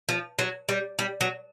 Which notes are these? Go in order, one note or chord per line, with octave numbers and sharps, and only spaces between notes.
F3
F#3
G3
G3
F#3